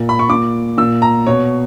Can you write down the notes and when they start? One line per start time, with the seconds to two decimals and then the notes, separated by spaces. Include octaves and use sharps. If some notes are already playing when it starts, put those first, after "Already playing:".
Already playing: A#2
0.09 B5
0.19 C#6
0.29 A#2 D6
0.78 A#2 E6
1.02 A#5
1.27 B2 C#5